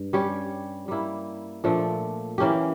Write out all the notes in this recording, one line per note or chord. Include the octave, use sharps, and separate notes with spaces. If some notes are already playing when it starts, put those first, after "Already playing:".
Already playing: G2
G3 C#4 G4 C#5
G3 A#3 E4
A#2 F3 A3 D4
E3 A#3 C#4 G4